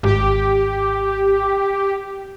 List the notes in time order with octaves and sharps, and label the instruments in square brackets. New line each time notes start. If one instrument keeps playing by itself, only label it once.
[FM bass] G#1 [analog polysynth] G4